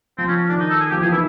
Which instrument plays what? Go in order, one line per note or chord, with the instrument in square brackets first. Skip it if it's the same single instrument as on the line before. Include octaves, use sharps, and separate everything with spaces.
[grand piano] F3 [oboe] C4
[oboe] C#4
[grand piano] D#3 [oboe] D4
[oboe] D#4
A4
G#4
[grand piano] F3 [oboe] G4
[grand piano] E3 [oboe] G#4
[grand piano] D#3 [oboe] E4